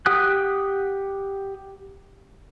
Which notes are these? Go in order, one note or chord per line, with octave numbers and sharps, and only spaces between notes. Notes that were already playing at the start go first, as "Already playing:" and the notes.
G4 F#5 G5 D#6 F#6